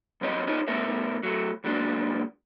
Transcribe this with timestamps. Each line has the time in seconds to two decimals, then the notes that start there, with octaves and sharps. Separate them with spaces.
0.21 B1 G2 F#3 C4 C#5 D#5
0.47 D#4 F4 G#4 C#5 D#5
0.68 C2 A3 B3 A#4 E5
1.23 F#3 A3
1.64 C#2 A#2 F#3 G#3 D4